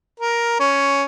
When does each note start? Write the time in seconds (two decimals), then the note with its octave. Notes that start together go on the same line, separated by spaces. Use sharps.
0.20 A#4
0.59 C#4